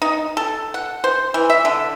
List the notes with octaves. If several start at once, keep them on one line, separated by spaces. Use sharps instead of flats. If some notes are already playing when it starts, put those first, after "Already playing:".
D#4
A4
F#5
C5
E3
E5
D3